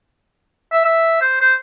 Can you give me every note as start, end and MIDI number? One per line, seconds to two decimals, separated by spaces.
0.72 0.81 76
0.85 1.17 76
1.21 1.41 72
1.41 1.54 72